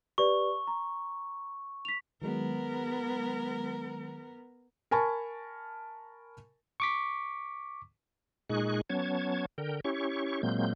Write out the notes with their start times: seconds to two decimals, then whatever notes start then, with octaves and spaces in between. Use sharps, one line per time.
0.18 G4 B4 D5 C#6
0.67 A#5
1.85 B6 F7
2.22 D#3 F#3 G#3 B3 A#4
4.91 A#4 G#5 A5 B5 C#6
6.80 C#6 D6 B6
8.49 A#2 G#3 D#4 G#4 C#6 F#6
8.90 F#3 B3 C#4 C#5 A5 G#6
9.58 D3 A#4 G5
9.85 C#4 E4 G4 C#5 C#6
10.43 A#2 F#3 G#3 A#3 C4 G6